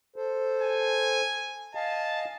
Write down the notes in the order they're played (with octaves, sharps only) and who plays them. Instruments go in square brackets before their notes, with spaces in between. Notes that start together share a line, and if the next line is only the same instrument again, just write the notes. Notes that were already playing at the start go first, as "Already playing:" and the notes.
[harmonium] A4 C5
[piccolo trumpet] G#5
[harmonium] D#5 F5 G#5 [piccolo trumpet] A5